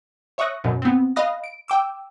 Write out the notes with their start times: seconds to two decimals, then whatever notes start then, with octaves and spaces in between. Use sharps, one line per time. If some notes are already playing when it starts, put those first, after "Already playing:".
0.38 C#5 E5 C#6 D#6 F#6 A#6
0.64 F#2 B2
0.82 B3 C4
1.16 D#5 F5 B5 D#6 F#6 A#6
1.44 D7
1.68 G5 D6 E6